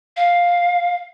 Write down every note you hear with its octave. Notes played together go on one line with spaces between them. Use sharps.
F5